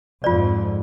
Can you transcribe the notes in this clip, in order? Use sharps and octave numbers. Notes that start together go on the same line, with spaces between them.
F2 G#2 F4 D5